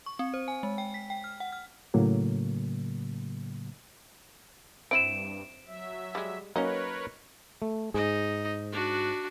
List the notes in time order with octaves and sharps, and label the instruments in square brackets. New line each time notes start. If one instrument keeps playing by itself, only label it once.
[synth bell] C#6
C4
C5
G#5
G#3
G5
B6
G5
F6
F#5
F6
[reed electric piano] A2 C#3 F#3 A#3
[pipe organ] G2 [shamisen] C4 E4 [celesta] D7 E7
[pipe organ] F#3 E5
[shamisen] G3 G#3
[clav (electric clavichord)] F#3 A#3 C#4 [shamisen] D#4 [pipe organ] A#4 B4 C#5
[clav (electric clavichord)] A3
[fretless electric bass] G#2 [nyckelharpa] D#4 D#5 [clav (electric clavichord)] G#4
[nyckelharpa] D4 F#4